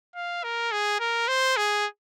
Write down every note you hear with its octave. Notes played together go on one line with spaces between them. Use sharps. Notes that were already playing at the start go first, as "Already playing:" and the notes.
F5
A#4
G#4
A#4
C5
G#4